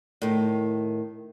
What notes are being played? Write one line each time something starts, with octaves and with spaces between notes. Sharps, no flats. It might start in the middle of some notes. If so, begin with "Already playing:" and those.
A2 D#3